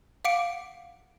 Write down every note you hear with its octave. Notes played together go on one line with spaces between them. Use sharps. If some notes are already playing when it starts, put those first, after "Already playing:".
F5 F#5 D6 C#7 D7